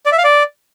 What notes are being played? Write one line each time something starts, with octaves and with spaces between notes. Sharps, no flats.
D5
E5
F5
D5